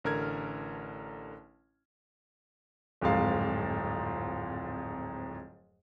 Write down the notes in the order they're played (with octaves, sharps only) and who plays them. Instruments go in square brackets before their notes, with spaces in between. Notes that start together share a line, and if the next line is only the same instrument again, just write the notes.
[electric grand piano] A1 D3 A#4 F6 G#6
[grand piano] D1 F2 G#2 F5